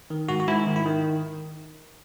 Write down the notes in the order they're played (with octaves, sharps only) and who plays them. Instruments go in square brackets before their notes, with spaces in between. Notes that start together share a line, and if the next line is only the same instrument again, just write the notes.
[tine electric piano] D#3
G#2 F#4
F#4
G#2 E4
D#3
E4
D#3